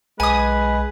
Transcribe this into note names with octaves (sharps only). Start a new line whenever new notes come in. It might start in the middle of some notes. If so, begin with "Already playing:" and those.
B1 G#3 B4 G#5 D#6